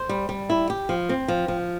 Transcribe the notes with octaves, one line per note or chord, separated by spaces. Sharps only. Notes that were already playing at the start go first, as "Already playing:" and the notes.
Already playing: C5
G3
G3
E4
G4
F3
C4
F3
F3